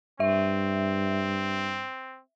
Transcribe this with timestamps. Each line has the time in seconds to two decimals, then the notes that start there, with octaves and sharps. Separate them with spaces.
0.20 G2 C4 E5